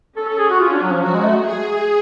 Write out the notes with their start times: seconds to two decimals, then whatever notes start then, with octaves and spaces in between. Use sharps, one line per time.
0.17 C#4 A4
0.28 A4
0.39 G#4
0.50 F#4
0.60 F4
0.72 D4
0.82 F#3
0.93 F3
1.03 F#3 F#4
1.14 G#3
1.24 A3
1.46 G#4